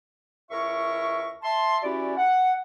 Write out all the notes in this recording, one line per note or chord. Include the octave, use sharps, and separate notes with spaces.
C#2 E4 A#4 E5 C#6
E5 A5 C6
E3 C#4 E4 F#4 G4 D5
F#5